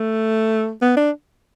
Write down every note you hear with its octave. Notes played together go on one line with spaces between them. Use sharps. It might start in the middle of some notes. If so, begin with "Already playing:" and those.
Already playing: A3
B3
D4